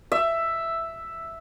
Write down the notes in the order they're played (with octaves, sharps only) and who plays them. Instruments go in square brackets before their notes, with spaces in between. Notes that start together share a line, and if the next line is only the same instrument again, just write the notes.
[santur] E5